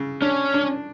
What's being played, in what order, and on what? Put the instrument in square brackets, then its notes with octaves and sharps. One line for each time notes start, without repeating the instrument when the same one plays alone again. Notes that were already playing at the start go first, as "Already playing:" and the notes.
Already playing: [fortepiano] C#3
[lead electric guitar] C#4 [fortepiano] D4
[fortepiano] D4